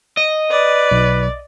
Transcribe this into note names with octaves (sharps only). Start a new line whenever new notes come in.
D#5
B4 D5
B1